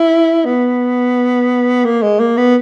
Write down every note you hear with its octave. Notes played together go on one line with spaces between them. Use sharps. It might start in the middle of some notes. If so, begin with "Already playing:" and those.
Already playing: E4
B3
A#3
G#3
A#3
B3